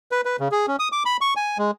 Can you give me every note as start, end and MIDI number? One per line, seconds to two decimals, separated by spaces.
0.12 0.21 71
0.25 0.36 71
0.40 0.48 49
0.51 0.66 68
0.67 0.76 61
0.79 0.88 87
0.92 1.03 86
1.05 1.17 83
1.21 1.34 85
1.36 1.58 80
1.58 1.71 56